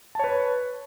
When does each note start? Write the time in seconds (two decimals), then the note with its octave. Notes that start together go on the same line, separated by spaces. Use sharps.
0.15 A5
0.19 C#5
0.24 B4